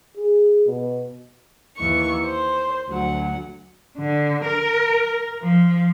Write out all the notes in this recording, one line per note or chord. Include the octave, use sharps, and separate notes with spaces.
G#4
B2
D#2 E3 C#6
C5
D2 F#3 F#5
D3
A#4
F3